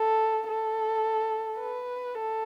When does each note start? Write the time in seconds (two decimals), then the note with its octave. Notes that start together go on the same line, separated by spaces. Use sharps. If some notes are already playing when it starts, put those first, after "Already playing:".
Already playing: A4
0.48 A4
1.59 B4
2.15 A4